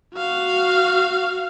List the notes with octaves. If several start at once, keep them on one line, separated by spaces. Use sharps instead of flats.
F#4 F5